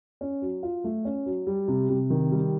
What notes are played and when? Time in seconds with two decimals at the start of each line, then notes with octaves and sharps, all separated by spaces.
0.21 C#4
0.42 F#3
0.63 F4
0.84 A3
1.05 C#4
1.26 F#3
1.47 G3
1.68 C3
1.89 C3
2.10 D#3
2.31 G3